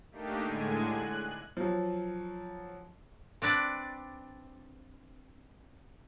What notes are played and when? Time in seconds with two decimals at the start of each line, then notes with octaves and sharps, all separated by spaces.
0.11 A3 A#3 D4 D#4 G4
0.43 A2 D3 G#3 G#5
0.87 F#6
1.57 F3 F#3
3.42 C4 D4 B4 D5